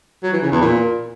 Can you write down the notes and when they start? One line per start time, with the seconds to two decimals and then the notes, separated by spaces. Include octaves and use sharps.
0.23 F#3
0.33 E3
0.42 C#3
0.52 E2
0.61 A#2